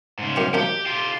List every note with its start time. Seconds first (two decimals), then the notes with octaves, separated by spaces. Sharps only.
0.19 G#2 C#3
0.36 F#2 G4 C#6
0.54 F#2 F3 D#4 G4
0.86 F4 G4